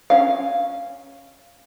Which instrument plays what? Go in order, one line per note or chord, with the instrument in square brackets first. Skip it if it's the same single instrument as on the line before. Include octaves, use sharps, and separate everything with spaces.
[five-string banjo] C#4 F5